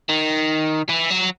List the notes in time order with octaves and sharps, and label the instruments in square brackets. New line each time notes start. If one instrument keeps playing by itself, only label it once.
[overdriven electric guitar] D#3
E3
F#3